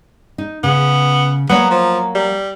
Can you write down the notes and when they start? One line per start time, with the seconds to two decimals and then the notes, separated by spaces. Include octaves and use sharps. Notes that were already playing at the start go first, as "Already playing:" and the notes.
0.38 D#4
0.64 C#3 B3
1.49 F#3 A#3 B3 C#5
1.71 F3
2.15 G3